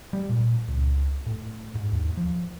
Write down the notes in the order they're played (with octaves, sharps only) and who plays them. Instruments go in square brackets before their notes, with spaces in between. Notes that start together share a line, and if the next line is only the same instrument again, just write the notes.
[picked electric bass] G3
A#2
C#2
A2
G#2
D#2
F3